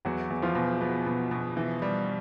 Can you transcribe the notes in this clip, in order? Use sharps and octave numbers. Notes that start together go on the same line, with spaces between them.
E2 F#3 F#4
E2
F3 F4
B2
B3
B2
B2
E3
G3